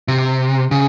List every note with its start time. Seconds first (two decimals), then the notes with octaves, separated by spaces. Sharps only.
0.08 C3
0.71 C#3